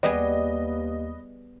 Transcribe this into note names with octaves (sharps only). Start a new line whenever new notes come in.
D#2 G3 B3 G#4 B4 D#5